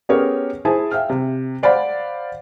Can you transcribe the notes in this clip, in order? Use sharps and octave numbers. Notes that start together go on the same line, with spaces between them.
B3 C#4 G4 G#4 A#4 C#5
E4 G#4 C5 G#5 A5
E5 F5 G5 F6
C3
C5 D5 F5 F#5 B5